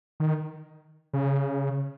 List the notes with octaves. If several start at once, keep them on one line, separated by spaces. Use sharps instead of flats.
D#3
C#3